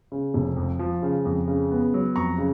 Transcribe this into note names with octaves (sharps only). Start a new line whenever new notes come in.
C#3
F1
F2
F3
C#3
F2
C#3
B3
F#3
F2 A#5 C#6
C#3